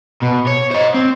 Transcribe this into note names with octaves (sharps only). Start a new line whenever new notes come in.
B2
C#5
C5 D#5
C4